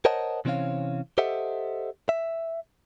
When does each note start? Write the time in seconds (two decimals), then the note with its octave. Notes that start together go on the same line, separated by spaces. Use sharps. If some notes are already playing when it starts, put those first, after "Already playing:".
0.05 A#4 C5 C#5 D#5 F#5 A5
0.45 C3 E3 C4 C#4 C#5 F5
1.18 G4 A4 C5 D#5 E5 F#5
2.09 E5